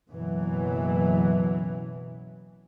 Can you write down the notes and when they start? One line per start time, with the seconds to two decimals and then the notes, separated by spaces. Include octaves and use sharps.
0.10 F#1 B2 E3 F#3